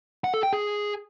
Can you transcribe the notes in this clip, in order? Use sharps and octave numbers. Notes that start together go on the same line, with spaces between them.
F#5
A4
G5
G#4